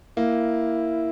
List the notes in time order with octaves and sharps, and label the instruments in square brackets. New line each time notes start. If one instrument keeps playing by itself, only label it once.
[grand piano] A#3 [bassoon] E4